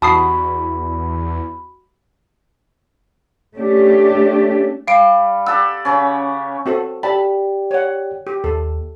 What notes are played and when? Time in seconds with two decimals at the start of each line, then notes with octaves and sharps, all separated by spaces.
0.02 E2 F#4 A5 B5 D#6 C7
3.56 A3 C#4 D4 G4
4.87 G3 F5 D7
5.47 G4 A4 F#5 E6
5.85 C#3 C#4
6.66 C4 F#4 A4
7.03 G4 D5 G5 A5 B5
7.71 C#5 F#5
8.27 G4
8.44 D#2 A4